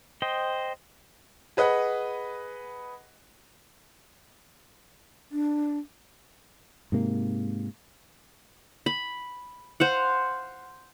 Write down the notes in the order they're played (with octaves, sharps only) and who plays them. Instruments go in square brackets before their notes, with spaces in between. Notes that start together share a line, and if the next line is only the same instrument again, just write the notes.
[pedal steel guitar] C5 D#5 G5
[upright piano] G#4 B4 D#5 F#5
[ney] D4
[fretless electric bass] G#2 C3 A#3
[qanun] B5
C5 F5 F#5